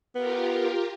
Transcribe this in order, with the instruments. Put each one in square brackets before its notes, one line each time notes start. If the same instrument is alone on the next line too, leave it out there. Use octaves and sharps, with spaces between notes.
[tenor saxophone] B3 [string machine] F4 G4 A#4